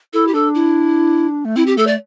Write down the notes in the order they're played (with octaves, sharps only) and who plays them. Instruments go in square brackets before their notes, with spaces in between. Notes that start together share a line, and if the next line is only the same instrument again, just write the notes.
[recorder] E4 [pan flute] A4
[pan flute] G4
[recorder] D4 [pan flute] A4
[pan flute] E4
[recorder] A3
[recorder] C4 [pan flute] E4
[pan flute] G4
[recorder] A3 [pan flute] A4
[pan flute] D5